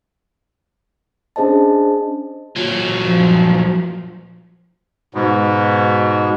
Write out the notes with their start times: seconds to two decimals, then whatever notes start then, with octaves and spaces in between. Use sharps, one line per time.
1.36 C#4 D4 G#4 C5 D#5 A5
2.56 A#2 F#3
3.03 F3
5.14 G#2 B2